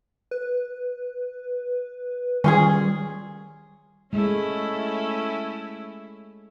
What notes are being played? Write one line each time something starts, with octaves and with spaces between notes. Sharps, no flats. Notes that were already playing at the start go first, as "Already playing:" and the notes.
B4
D#3 G3 C#4 F4 G#4
G#3 A3 C#4 E4